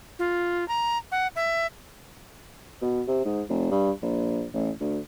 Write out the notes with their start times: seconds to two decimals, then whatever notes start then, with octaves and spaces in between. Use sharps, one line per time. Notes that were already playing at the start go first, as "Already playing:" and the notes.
0.19 F4
0.68 A#5
1.12 F#5
1.36 E5
2.82 B2
3.07 C3
3.25 G#2
3.49 F1
3.71 G2
4.03 A#1
4.54 A1
4.80 D2